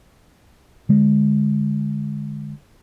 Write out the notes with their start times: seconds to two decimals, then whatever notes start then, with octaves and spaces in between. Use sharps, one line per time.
0.89 D3 G#3